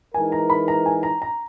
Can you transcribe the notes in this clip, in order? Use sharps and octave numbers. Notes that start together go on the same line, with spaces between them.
E3 G#3 D#4 A#4 G#5
A#5
B5
A#5
G#5
A#5
A#5